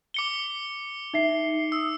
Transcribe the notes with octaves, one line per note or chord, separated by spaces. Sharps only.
D6 C#7 G7
D#4 E5 C7
D#6 E6